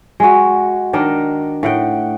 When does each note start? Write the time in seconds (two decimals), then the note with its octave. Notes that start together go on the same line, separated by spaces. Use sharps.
0.20 G#3 F#4
0.93 D#3 D4 D#4
1.63 A2 F#5 G5